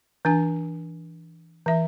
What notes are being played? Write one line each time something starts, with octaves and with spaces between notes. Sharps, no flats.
E3 D4 G#5
E3 E5